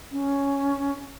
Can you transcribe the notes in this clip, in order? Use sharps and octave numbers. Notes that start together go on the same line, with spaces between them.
C#4